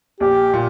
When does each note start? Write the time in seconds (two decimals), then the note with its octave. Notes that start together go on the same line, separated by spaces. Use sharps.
0.20 A#1 G4
0.53 A#2